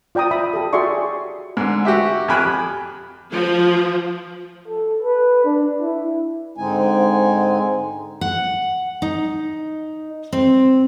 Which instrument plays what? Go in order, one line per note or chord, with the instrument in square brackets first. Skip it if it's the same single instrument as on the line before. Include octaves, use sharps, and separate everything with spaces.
[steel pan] F4 D5 G5 A#5 D#6
E5 B5 D#6
G4 A4
F#4 G#4 D5 E5 C6 C#6
[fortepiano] G#2 D3
F#4 G4 E5
F2 G4 G#5 B5 F#6
[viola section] F3
[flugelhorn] A4
B4
D4
E4
[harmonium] G#2 D3 G#3 C4 D#4 G#5
[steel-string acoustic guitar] F#5
D#4
C4